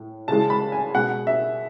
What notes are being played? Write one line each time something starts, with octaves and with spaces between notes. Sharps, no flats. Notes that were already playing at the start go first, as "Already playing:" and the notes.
Already playing: A2
C#3 E3 G#3 A5
B5
G#5
B2 G#3 F#5
E5